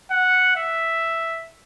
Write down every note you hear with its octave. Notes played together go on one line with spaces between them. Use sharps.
F#5
E5